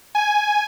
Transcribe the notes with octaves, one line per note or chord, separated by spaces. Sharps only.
G#5